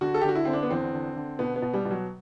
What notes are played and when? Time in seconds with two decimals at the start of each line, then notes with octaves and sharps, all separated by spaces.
0.01 D3 F#4
0.14 A4
0.21 G4
0.24 D3 F#4
0.35 E4
0.45 D3 C4
0.53 D4
0.63 B3
0.70 E2 C4
0.93 D3
1.16 D3
1.39 B2 B3
1.56 B3
1.62 B2
1.73 G3
1.85 B2
1.91 F#3